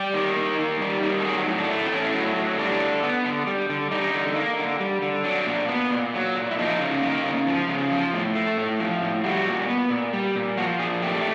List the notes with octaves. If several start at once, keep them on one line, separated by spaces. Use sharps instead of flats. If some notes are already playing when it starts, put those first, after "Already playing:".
Already playing: G3 G4
D#3
A#3
D#3
G3
D#3
A4
F#3 G#4
A2
D4
A3
C4
A2 C#4
F#3
A2
G3 D4
D3
B3
D3
G3
D3
G3 D#4
D3
A#3
D3
G3
D3
F#3 D4
A#2
B3
A#2
F#3
A#2
E4
F3 D#4
C#3
A#3
C#3
F3
C#3
F3
A2
A3
A2
F3
A2
G3 F#4
A#2
B3
A#2
G3
A#2
F3 F#4
A#2 G#4
A3 G4